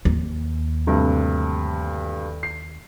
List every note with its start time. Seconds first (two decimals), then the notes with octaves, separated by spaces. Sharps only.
0.05 D#2
0.87 D2 G2 C3
2.43 C7